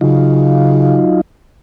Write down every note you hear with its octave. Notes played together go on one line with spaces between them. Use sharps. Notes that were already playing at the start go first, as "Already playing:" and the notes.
C#3 F#3 D#4 F4